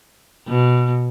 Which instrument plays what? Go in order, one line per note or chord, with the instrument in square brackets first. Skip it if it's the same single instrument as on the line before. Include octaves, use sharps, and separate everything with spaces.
[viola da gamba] B2